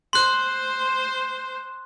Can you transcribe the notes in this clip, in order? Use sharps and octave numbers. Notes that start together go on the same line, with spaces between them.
C5 C6 F#6